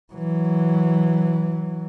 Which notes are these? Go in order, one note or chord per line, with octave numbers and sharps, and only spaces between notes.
E3 F#3